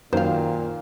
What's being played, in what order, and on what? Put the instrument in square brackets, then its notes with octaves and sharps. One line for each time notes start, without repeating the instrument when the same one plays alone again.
[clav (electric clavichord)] F#2 [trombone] A#2 [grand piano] D#3 A#3 [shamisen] C5 F5